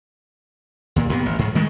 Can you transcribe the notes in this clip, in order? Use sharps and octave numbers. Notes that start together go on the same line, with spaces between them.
D#2 A#2
D#2 D#3 G3 B3
A1
G#2
D#3 G#3 A3